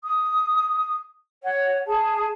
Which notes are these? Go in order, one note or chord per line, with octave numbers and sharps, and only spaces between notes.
D#6
C#5 F#5
G#4 A5